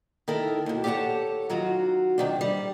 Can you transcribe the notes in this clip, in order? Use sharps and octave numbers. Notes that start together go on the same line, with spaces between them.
D#3 E4 A4 A#4
D#2 B2
G4 A4 C#5 D5 F#5 A5
D#3 F#3 F4 F#4
C3 D#3 D4
G3